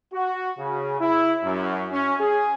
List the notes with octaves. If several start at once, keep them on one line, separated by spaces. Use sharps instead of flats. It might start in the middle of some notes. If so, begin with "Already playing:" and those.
F#4
C#3
E4
F#2
C#4
G#4